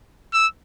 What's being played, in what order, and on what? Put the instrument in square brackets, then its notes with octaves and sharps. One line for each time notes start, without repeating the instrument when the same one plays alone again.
[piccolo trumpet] E6